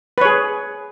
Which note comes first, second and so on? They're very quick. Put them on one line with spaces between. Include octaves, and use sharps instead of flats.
B4 C#5 G#4